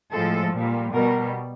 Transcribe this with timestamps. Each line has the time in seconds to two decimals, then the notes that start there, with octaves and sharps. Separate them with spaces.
0.12 A2 F3 G#3 A4
0.52 A#2 G3
0.93 B2 G3 A#4